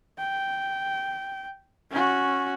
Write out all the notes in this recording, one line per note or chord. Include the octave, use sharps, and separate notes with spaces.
G5
C#4 F#4